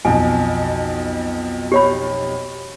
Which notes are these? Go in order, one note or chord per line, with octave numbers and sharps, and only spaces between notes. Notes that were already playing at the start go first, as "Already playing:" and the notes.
B1 F2 G#5
G4 C#5 B5